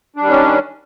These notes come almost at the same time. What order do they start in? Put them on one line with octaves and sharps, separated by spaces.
D4 G3 D#3 C#4